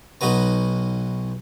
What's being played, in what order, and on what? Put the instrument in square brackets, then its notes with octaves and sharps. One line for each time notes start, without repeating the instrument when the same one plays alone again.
[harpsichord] B1 D#4 F#4 B4 A#5